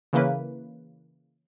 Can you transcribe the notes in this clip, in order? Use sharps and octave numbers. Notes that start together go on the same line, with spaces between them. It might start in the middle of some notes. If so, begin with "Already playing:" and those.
C#3 E3 A#3 B4